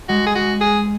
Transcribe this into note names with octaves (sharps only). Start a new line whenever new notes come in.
G#3 F#4
G#4
F#4
G#4